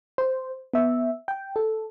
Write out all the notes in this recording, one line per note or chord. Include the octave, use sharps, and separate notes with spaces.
C5
B3 E5
G5
A4